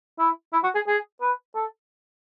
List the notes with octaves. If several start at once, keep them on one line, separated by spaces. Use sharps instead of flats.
E4
E4
F#4
G#4
G#4
B4
A4